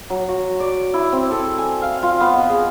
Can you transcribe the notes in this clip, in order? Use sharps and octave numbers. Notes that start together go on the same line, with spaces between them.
F#3
F#4
D5
E4
C4
A4
G#5
F5
F4
B3
D#5
G#4